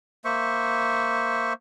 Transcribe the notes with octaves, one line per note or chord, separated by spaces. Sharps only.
A#3 C5 E5 C#6